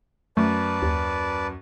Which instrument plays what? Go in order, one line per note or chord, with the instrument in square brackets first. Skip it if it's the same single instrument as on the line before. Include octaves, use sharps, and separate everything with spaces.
[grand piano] F#2 [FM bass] A3 [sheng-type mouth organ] B4 D5 A5
[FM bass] D#2